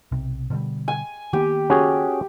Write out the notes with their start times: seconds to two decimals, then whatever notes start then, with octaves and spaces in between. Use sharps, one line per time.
0.12 B1 C3
0.50 B2 D3 G3
0.88 G#5
1.33 D#3 A#3 B3 G4
1.70 C#4 F#4 G#4